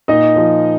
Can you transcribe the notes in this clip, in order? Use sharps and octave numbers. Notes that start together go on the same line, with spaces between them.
A#2 D#4 D#5
F3